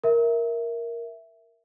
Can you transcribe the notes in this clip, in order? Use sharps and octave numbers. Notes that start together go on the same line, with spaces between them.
A#4 E5